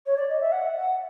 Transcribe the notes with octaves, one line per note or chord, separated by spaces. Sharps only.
C#5
D5
D#5
E5
F#5
F#5